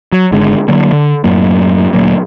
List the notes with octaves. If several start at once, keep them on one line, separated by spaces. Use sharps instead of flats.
F#3
G#1 D3 G#3
D3 F#3 A#3
D3
F#2 A2 F#3 A#3
D2 A#2 F#3 A#3